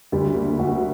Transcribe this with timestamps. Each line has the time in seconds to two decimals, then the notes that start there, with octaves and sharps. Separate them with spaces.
0.12 D2 G3
0.35 A#3
0.59 D2 F#4